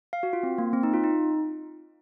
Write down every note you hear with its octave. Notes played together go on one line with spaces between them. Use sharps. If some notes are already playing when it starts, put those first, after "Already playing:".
F5
F#4
F4
C4
A#3
C4
D#4
F4
D#4